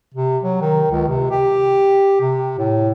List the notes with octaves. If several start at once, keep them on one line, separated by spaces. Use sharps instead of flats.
C3
F#3
D#3
C#2
C3
G4
C3
A2